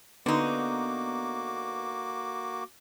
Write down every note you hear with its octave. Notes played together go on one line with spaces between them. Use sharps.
D3 A#3 B3 D#4 F#4 D6